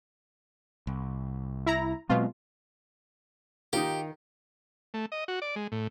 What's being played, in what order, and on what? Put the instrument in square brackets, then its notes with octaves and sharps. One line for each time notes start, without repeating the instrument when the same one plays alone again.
[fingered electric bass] C2
[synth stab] E4 A#5
[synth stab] B2 F4 [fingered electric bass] F#3 G#3 C4
[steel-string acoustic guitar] D#3 [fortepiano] D#4 F4 [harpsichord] G4
[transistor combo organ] A3
D#5
F#4
D5
G#3
A2